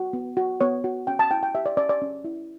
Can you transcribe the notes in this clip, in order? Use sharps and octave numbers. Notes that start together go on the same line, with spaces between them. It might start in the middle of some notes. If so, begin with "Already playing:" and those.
Already playing: F#4
B3
F#4
B3 C#5
F#4
C#4 G5
A5
E4 G5
G5
G4 E5
D5
C#4 D5
D5
C#4
E4